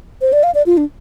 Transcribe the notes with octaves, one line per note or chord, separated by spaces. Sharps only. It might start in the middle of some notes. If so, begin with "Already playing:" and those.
C5
D5
F5
D5
F4
D4